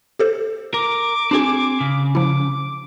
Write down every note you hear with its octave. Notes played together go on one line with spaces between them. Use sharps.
G4 A4 C5
A#4 D6
C4 D4 F#4 G#4 G#5
C#3
F3 E4 D6